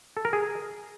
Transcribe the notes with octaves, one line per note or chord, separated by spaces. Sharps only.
A4
A#4
G#4